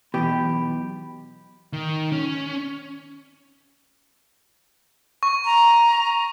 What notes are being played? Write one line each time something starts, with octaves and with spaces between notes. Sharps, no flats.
B1 B2 E3 G4 B5
D#3
C#4
C#6
A#5